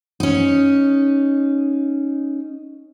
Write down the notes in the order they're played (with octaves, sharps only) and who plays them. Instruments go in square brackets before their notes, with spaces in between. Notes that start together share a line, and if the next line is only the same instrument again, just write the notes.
[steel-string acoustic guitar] C#4 D#4